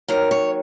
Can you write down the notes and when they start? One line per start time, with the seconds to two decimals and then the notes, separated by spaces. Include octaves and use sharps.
0.08 D#2 D#3 F#3 A#4
0.31 C#5